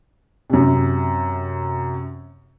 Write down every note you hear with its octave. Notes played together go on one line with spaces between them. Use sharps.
F#2 C3